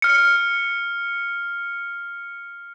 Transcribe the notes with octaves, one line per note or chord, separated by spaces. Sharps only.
F6 C#7